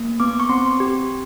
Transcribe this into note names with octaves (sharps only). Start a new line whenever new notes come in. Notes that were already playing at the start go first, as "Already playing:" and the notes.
Already playing: A#3
B3 D6
C#6
C4 C6
G4